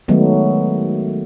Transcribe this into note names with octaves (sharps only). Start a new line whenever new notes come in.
D#3 F#3 G#3 A3 B3